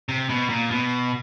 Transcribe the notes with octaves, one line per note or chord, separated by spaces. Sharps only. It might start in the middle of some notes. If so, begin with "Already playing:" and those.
C3
B2
A#2
B2